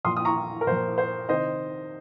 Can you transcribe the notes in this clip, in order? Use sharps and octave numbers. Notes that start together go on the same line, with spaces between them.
A#2 F3 C6 D#6
D#6
A#5 C#6
A#4
A#2 F3 C5
C5
C3 D#3 C5 D#5